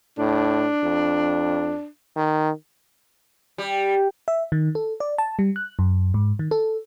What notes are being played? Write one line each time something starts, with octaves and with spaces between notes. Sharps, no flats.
A2 D4
F2
D#3
G3
E5
D#3
A4
D5
A5
G3
F#6
F#2
G#2
D#3
A4